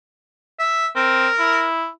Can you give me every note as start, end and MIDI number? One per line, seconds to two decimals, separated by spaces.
0.59 0.87 76
0.96 1.28 60
0.96 1.63 70
1.39 1.89 64